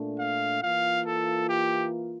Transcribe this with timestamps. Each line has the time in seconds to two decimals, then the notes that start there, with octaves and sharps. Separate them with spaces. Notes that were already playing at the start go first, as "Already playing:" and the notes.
Already playing: A#2 A3 D4
0.19 F5
0.62 E3 A#3 F4 F5
1.06 A4
1.49 G4